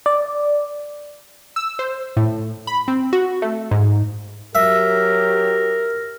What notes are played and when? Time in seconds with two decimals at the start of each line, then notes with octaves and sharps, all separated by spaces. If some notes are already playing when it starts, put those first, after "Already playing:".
0.06 D5
1.56 E6
1.79 C5
2.17 A2
2.67 B5
2.88 C4
3.13 F#4
3.42 A3
3.71 G#2
4.55 F#3 G4 A#4 E5